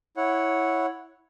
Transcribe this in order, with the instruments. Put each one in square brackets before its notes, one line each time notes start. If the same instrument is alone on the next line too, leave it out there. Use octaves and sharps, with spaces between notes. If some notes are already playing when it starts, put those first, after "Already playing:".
[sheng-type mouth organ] E4 C#5 F#5